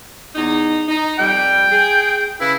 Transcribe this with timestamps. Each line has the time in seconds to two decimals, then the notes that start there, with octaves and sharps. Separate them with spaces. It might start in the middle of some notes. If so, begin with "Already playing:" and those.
0.35 E2 D#4
0.88 D#4
1.19 F2 G3 G5
1.71 G#4
2.40 C#3 E4 B4